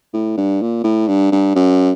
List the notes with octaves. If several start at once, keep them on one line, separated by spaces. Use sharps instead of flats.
A2
G2
A#2
A2
G2
G2
F#2